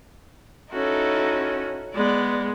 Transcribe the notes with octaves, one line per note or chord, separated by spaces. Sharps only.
C#4 D#4 E4 F#4 A4
G#3 B3 D5